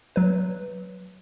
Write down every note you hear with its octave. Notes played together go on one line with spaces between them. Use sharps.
F#3 B4